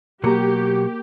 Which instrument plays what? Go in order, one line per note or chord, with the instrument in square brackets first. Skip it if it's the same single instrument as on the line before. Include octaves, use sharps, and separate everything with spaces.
[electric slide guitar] B2 F#3 F#4 [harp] A#3 A#5 [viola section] G4